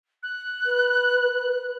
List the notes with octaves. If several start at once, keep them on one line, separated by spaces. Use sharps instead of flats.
F#6
B4